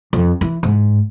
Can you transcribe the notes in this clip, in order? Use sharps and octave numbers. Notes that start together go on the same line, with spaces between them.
F2
E3
G#2